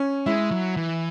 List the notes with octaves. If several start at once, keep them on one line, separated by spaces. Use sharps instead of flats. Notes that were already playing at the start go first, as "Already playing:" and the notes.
Already playing: C#4
G#3 E4
F#3
E3